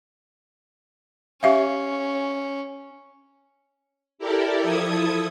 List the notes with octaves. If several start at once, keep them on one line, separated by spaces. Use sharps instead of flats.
C#4 G4 E5 F5
E4 G4 A4 A#4 D5
F3 E4 A4 D#6 G#6